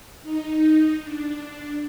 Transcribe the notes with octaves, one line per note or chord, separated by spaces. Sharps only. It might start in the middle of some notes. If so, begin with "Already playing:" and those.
D#4
D4